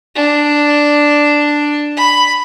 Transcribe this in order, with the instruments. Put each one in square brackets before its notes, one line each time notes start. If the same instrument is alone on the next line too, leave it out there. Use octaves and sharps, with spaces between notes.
[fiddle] D4
B5